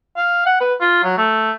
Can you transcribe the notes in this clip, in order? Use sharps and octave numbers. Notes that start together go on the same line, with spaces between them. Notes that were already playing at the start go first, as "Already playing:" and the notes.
F5
F#5
B4
F4
F#3
A3